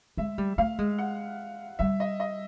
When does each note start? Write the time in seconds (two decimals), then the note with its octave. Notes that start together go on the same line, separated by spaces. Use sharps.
0.17 G#3 E5
0.38 G3
0.58 A3 F5
0.79 G#3
0.98 F#5
1.79 G3 E5
2.00 D#5
2.20 D#5